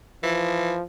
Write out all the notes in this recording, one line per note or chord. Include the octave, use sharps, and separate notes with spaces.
E3 F3